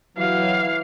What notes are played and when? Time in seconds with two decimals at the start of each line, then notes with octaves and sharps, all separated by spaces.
0.18 E3 F#3 F5